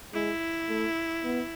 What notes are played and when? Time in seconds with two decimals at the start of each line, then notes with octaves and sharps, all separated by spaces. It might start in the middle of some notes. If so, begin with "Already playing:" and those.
0.13 G#3 E4
0.69 A3
1.24 B3